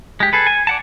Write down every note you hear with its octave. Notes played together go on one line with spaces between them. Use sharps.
G#3 G4
G#4 A4 B4
G#5
D5 F#5 A5